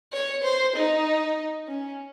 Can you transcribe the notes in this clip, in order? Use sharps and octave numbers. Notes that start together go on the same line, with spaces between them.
C#5
C5
D#4
C#4